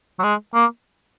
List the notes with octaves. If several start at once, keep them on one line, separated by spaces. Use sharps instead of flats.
F#3
G#3
A#3